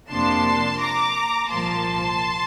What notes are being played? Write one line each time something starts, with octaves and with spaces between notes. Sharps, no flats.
F2 C3 F3 A#3 D4 A5 C6
A#5 D6
C2 A#2 F3 A#3 A5 C6